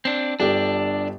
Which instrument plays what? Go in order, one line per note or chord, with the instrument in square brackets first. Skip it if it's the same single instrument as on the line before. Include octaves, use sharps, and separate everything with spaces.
[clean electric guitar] C4 D4
[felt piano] G1 G4 A4 [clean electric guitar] D4